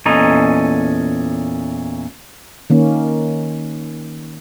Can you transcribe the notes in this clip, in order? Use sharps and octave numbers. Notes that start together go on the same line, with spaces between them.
E2 A#2 C#4 A4 D#5 A#5
D#3 A#3 C#4